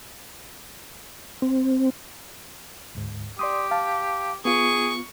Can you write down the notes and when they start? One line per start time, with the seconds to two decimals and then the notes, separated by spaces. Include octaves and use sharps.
1.42 C4
2.95 D2 G#2
3.39 G4 D5 C6 D#6
3.71 F5 A5
4.45 B3 F4 G#4 C#6